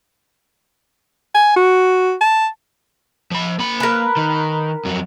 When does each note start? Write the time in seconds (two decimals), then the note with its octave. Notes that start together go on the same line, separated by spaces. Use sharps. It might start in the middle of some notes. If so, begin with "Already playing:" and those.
1.34 G#5
1.56 F#4
2.21 A5
3.31 F3 B5
3.59 A#3 B5
3.80 A#4 B4
4.17 D#3
4.85 F2 F#3